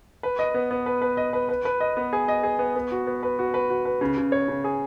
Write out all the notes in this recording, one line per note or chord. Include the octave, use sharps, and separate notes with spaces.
B4
D#5
B3
B3
B4
B4
D#5
B4
B4
B4
D#5
B3
G#4
D#5
G#4
B3
B3
F#4
B3
B4
F#4
B4
F#4
B4
C#3
C#3
C#5
C#3
G#4